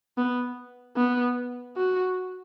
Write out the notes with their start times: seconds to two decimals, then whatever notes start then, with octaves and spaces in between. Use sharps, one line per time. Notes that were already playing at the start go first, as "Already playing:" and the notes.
0.18 B3
0.97 B3
1.76 F#4